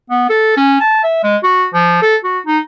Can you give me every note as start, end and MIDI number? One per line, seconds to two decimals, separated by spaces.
0.10 0.27 59
0.29 0.55 69
0.57 0.77 61
0.80 0.99 81
1.03 1.23 76
1.23 1.37 56
1.43 1.66 66
1.74 2.02 53
2.02 2.16 69
2.24 2.39 66
2.46 2.59 63